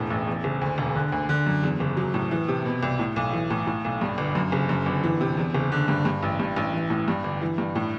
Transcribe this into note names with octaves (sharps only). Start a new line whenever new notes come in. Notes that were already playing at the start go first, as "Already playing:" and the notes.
Already playing: E1 A2
A1
E2
F#1
D2
E1
D3
D2
D3
F#2
E2
F#1
F#3
A2
E3
C3
B2
C2
A2
B1
E3
A2
A2
B1
G2
G1
F#2
F#1
F#2
G1
E3
C3
E2
F#1
D3
G2
G2
A1
G2
A1
E3
A2
G2
G1
E3
G2
A2